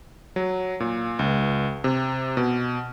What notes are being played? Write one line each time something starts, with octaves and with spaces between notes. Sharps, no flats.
F#3
A#2
C#2
C3
B2